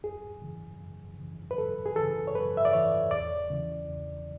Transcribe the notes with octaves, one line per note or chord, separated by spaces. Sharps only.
F#2 G#4
C#3 E3
F#2
C#3 E3
B4
F#2 A4
G#4
E3 A4
C#3
C#5
F#2 B4
E5
D5
C#3 E3 C#5
E2 D5
C#3 E3
E2